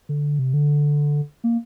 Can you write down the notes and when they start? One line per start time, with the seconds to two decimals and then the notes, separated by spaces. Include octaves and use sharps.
0.09 D3
0.39 C3
0.54 D3
1.44 A#3